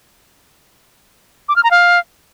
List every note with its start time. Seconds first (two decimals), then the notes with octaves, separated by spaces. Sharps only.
1.49 D6
1.56 F6
1.63 A#5
1.71 F5